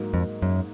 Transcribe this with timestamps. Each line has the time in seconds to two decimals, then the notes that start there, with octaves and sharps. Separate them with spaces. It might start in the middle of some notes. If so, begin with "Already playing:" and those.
Already playing: G#2 F#3 A#3
0.14 F2
0.42 F#2